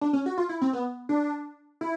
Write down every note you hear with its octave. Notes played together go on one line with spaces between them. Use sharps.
D4
C#4
F#4
F4
E4
C4
B3
D4
E4